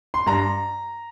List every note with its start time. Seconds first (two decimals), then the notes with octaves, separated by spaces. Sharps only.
0.14 C6
0.26 G2 A#5